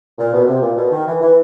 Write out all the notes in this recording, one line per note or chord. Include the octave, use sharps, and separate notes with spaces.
A#2
B2
C3
A#2
B2
D#3
E3
E3